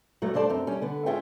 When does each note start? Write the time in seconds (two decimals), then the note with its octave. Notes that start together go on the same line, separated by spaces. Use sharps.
0.22 G2 F#3 A3
0.34 G2 G3 C5 D5 A5
0.49 F#2 C4
0.67 G3 C#4
0.82 D3 B3
1.06 G#2 C#4 F4 G#4 E5 G5